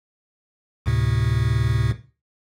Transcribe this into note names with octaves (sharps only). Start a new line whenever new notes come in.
D2 A2 C3